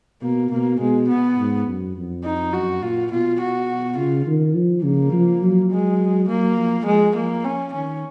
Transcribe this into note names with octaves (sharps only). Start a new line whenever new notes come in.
B2 A#3
B2 A#3
B2 G#3
B3
G#2
F#2
F2
D#4
F#2 F#4
A#2 F4
B2 F4
F#4
C#3 F4
D#3
F3
C#3 A#3
F3
F#3
G#3
F#3 A#3
F3
F3 G#3
F3 A#3
C#4
D#3 C#4